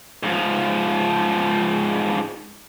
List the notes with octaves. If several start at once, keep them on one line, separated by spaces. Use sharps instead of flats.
G#2 F3